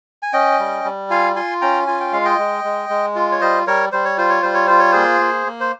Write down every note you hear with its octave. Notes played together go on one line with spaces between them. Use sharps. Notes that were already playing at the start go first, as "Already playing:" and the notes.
G#5
C#4 D#5 G5
G3
G3
F4 F5 G#5
F4 G#5 C6
C#4 G5 A#5
F4 G#5
G5
G#3 F5
D#5 G5
G#3
G#3
G#3
F4
C#5
G3 C5 D#5
G3 A#4 C#5
G3 C5
C#5
F4 C5
C#5
G3 C5
C#5
F4 C5
C#5
A#3 G#4 C5
A#3
A#3
C5